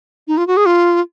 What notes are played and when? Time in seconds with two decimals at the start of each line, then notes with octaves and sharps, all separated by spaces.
0.28 D#4
0.37 F4
0.47 F#4
0.57 G#4
0.66 F4